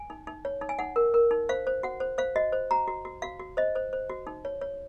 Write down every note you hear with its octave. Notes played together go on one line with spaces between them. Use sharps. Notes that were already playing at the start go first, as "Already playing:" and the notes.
Already playing: G#5
D#4
D#4
C#5
D#4
G#5
D#4 F#5
A#4
A#4
D#4
C5 F5
C5
F#4 F#5
C5
C5 F5
F#4 D#5
C5
F#4 A#5
F#4
F#4
F#4 F5
F#4
C5 D#5
C5
C5
F#4
D#4
C#5
C#5